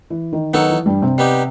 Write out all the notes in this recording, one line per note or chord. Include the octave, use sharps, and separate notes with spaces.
E3
D#3
D#3 F#3 B3 D#4 A4
E3
G2 G3
C3 C4
G3 B3 D#4 G4